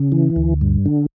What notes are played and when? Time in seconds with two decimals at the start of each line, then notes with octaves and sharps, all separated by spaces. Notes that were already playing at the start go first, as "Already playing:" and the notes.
Already playing: C#3
0.12 E3
0.36 D2
0.61 G2
0.86 D3